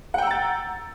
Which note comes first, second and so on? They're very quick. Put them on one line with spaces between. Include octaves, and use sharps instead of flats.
F#5 G5 E6 A#5 A6